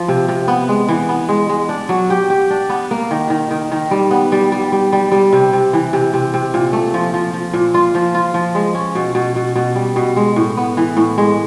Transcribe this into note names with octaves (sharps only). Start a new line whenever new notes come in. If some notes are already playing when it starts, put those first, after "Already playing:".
Already playing: F3
C3
C3
B3
G#3
E3
B3
G#3
G#3
D4
F#3
G4
G4
D4
B3
A#3
D#3
D#3
D#3
D#3
G3
B3
G3
G3
G3
G3
G3
C3
C3
E3
C3
C3
C3
A#2
A3
F3
F3
F3
A#2
F4
F3
F4
F3
G#3
C#4
B2
B2
B2
B2
G3
B2
G#3
A2
B3
E3
A2
G#3